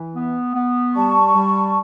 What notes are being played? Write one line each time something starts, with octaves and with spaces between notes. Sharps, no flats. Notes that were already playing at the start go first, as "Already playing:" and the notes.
Already playing: E3
B3
B3
G3 A5 C#6
G3